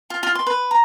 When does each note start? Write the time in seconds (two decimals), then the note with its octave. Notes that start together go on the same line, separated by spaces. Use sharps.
0.10 F4
0.23 F4
0.35 C6
0.47 B4
0.71 A#5